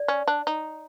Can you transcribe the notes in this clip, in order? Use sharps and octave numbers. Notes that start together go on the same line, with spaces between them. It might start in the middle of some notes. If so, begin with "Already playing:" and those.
Already playing: D5
C#4
D4
D#4